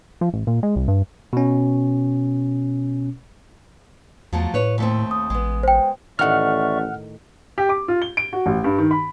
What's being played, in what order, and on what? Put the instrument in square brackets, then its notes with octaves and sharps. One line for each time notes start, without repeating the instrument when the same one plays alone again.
[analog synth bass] F3
A1
A#2
G#3
C2
G2
[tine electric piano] B2 C#4
[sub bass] E2 [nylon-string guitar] F3 F#3 A3
[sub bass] A2 [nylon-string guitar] B4 C#5
[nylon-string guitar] D#2 A3 C4
[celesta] D#6
[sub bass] A1 [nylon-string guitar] G#3 B3
[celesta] C5 G5
[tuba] A1 [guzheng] A2 D#3 [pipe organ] D5 E5 C#6 [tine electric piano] F#5 F6
[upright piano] G4
D6
F4
G7
D7
F#4
A1
G2
D#3
B5